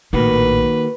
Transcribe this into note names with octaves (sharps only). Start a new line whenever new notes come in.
A#1 A2 D#3 A#3 F#4 B4